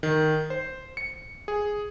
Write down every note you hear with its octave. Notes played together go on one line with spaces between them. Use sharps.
D#3
C5
C#7
G#4